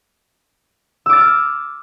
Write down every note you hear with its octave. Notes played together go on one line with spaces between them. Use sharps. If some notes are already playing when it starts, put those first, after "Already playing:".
D6 E6 F6 A6